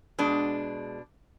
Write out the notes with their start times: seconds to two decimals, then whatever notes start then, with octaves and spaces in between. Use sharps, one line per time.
0.18 B2 G#3 D4